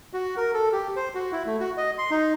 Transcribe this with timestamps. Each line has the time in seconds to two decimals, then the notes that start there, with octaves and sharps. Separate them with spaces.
0.13 F#4
0.37 A#4
0.54 A4
0.72 G4
0.96 C5
1.15 F#4
1.32 E4
1.46 A3
1.60 F#4
1.77 D#5
1.98 C6
2.11 D#4